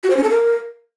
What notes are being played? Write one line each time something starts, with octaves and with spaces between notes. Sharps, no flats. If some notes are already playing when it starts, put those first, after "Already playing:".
F#4
C5
C#4
A4
A#4